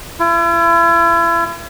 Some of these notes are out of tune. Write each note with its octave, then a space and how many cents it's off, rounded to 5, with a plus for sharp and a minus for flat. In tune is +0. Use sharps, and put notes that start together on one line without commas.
E4 +40